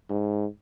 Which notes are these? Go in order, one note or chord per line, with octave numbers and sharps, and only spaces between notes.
G#2